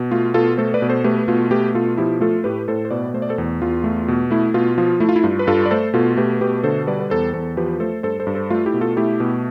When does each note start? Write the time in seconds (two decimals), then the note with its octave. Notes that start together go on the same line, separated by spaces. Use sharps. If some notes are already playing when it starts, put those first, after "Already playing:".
Already playing: B2
0.11 A3 F4
0.34 B2 F4 A4
0.57 A3 A4 C5
0.74 B4 D5
0.82 B2
0.89 A4 C5
1.04 A3 G4 B4
1.28 B2 F4 A4
1.51 A3 G4 B4
1.74 B2 F4 A4
1.97 F3 E4 G4
2.21 A3 F4 A4
2.44 A2 G4 B4
2.68 A2 A4 C5
2.85 C5
2.91 B2 B4 D5
3.14 A3 C5
3.22 D5
3.29 A4 C5
3.38 E2
3.61 E2 F4
3.84 A3
4.08 B2
4.31 A3 E4
4.54 B2 F4
4.78 F3 F4
5.00 A3 E4
5.09 F4
5.16 E4
5.24 G2 F4
5.39 B4
5.47 G2 F4 A4
5.66 D5
5.71 A3 A4 C5
5.94 B2 F4 A4
6.17 A3 G4 B4
6.41 B2 G4 B4
6.63 D3 A4 C5
6.87 G3 B4 D5
7.00 B4
7.10 E2 A4 C5
7.33 E2 A4 C5
7.57 F3 G4 B4
7.80 A3 A4 C5
8.03 G2 A4 C5
8.20 A4 C5
8.27 G2
8.35 A4 C5
8.50 A3 F4
8.66 E4 G4
8.74 B2
8.81 F4 A4
8.97 A3 E4 G4
9.20 B2